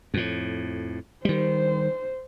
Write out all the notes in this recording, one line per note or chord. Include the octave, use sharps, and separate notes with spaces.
F2 A2
D#3 G3 C5